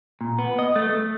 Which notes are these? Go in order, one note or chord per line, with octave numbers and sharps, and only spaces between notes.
A#2
B3
D#5
A3
A3